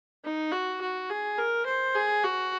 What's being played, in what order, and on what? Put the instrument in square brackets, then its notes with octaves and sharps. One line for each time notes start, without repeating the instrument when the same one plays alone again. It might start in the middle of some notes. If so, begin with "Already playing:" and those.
[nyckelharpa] D#4
F#4
F#4
G#4
A#4
C5
G#4
F#4